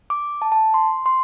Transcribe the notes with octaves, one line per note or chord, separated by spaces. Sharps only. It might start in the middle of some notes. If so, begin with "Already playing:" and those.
D6
A5
A5
C6
C6